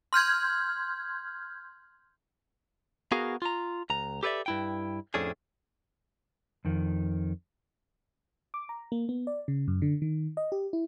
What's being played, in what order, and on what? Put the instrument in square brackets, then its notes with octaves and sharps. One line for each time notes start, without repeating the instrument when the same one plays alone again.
[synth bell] C6 F6 G6 G#6
[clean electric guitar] B3 F#4 G#4 A#4 F5
F4 A#5
C#2 A#5
G4 A4 B4 C#5 D5 E5
G2 E4 G5
F2 A2 A3 C#4 D4 G#4
[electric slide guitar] F2 D#3
[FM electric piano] D6
A#5
A#3
B3
D5
C#3
F#2
D3
D#3
D#5
G4
E4